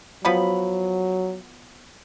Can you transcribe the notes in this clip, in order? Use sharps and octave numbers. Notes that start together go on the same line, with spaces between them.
F3 F#3 B3 B5